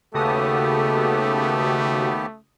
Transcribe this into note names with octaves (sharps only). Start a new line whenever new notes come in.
D#2 C#3 A3 B3 F#4 G4 A4 D#6